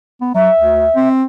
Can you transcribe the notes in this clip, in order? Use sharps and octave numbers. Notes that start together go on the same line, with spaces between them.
B3
F#3 E5
D2
C4